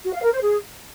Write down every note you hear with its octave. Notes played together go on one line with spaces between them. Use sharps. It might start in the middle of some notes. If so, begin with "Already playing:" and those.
F#4
F5
A#4
C5
G#4